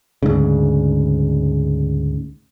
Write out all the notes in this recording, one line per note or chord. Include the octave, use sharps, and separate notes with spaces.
D2 G#2 C#3